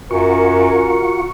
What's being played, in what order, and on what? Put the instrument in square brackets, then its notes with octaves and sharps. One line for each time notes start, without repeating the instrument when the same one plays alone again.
[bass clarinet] F#2 [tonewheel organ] F4 F#4 C#6 [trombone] A#4